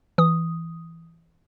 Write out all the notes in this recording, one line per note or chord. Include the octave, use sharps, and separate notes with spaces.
E3 D#6